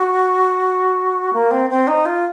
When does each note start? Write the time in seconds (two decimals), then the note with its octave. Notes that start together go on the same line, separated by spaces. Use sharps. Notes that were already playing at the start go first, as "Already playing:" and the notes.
Already playing: F#4
1.33 A#3
1.51 C4
1.70 C4
1.87 D#4
2.06 F4